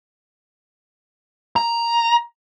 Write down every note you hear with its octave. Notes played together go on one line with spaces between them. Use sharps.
A#5